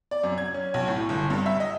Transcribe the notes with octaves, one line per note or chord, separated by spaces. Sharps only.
D5
F#2
G#6
C#4
B1
A2
G1
G2
E5
D#5